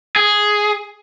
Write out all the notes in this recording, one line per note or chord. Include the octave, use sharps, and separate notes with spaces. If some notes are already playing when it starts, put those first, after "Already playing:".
G#4